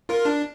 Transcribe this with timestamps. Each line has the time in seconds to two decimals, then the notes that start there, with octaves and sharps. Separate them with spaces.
0.09 F4 A#4
0.25 D4